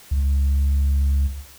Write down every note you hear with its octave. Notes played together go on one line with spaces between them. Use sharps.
C#2